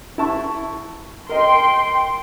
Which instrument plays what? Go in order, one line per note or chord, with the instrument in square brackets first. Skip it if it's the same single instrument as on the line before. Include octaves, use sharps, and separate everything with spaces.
[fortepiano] E4 A5 C#6
[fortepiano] A#4 D#5 [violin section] G5 C6